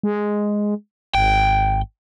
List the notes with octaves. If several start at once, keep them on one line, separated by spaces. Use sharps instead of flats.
G#3
G#1 G5